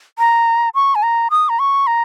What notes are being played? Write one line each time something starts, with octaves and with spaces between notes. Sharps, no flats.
A#5
C#6
G#5
A#5
D#6
A#5
C#6
A#5